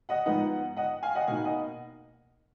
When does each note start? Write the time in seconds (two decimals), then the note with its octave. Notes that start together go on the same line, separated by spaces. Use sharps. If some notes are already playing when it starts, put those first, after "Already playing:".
0.09 D#5 F#5
0.26 G#2 F3 B3 D#4 D#5 F#5
0.76 D#5 F#5
1.03 F5 G#5
1.15 D#5 F#5
1.27 B2 A#3 D#4 F5 G#5
1.44 D#5 F#5